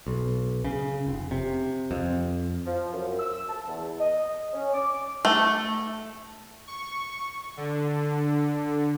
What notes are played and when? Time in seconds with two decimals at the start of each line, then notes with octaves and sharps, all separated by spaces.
0.07 B1
0.65 C#3
1.07 F1
1.31 C3
1.91 F2
2.65 F3
2.92 F#2
3.19 E6
3.49 A5
3.67 E2
3.99 D#5
4.53 C#4
4.74 D6
5.25 A3
6.67 C#6
7.57 D3